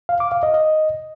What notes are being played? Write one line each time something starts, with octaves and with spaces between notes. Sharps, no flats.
F5
D6
F5
D#5
D#5